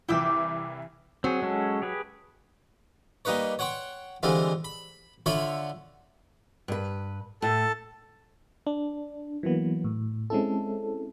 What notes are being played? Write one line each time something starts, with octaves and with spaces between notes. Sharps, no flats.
C2 E3 E4 G5 D6 E6
F#3 C4 G#4
G#3 C#4 A4
G4 G#4 B4
G3 A#3 D#4 B4 C#5
C#5 F#5 G5 C6 C#6
D3 E3 G3 G#3 C4 F4
B5
D3 F4 C#5 E5 B5 C#6
G2 B4
A2 A4 A5
D4
E3 F#3 A#3 B3
A2
G#3 C4 C#4 E4 A4